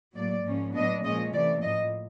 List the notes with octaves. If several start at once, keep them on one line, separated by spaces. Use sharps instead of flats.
A2 F#3 A#3 D5
G#2 F3 A#3 C#4
A2 F#3 B3 D4 D#5
A#2 F3 G#3 C#4 D#5
C3 E3 A3 D5
A2 F3 A#3 D#5